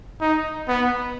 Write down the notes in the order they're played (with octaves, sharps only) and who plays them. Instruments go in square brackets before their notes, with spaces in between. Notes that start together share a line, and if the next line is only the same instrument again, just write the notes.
[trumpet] D#4
B3